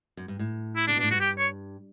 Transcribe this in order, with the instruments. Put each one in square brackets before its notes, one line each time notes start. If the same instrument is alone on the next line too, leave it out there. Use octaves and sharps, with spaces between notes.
[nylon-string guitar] F#2
G2
A2
[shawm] E4
[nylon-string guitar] C#3 [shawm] D4
[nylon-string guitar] B2
[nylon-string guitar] A2 [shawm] D4
[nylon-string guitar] G2 [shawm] F#4
[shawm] G4
C#5